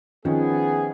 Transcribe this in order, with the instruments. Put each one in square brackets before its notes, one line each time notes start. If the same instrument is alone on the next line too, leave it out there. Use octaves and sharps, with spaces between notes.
[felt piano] D#3 F3 C#4 [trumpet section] B3 G#4